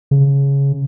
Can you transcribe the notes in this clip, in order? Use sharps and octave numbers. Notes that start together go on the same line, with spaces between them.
C#3